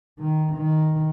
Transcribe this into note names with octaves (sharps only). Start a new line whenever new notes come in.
D#3
D#3